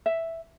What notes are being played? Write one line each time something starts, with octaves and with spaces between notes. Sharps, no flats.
E5